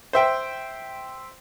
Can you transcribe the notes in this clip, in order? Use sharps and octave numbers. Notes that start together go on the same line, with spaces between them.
C5 E5 G5